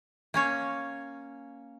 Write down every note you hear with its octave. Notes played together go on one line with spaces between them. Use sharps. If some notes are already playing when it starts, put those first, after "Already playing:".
A#3 C#4 C#5